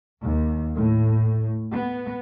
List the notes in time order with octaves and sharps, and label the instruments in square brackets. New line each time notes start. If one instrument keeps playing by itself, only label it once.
[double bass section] D#2
A2
B3